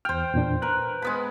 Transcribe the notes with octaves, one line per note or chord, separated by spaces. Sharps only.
E2 C5 G5 F6
E2 A#2 D4
A#4 B4 F#6
G#3 B3 B5